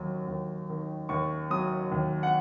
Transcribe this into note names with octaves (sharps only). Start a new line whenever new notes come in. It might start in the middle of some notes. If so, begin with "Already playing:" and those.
Already playing: D#2 F#3
D#2
D#3
D#2 C#6
F#3 D#6
D#2
F#5